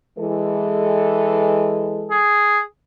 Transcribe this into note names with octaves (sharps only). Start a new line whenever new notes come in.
E3 G#3 A4
G#4